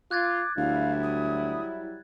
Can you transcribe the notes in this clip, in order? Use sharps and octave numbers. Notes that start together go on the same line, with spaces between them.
F4 D6 F#6 G#6 A6
D2 F#3 G3 E4 F5
D#6